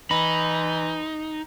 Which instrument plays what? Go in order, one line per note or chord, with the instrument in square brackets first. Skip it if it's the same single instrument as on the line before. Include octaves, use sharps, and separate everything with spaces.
[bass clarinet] E3 [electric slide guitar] D#4 [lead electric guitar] B5